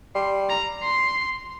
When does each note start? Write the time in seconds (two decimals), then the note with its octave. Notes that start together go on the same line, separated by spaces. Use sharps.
0.15 G3 C6
0.50 A#5
0.83 C6